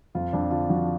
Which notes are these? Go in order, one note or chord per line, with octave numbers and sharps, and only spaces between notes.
F2 F4
F2 D4
D3 F4
F3 F#4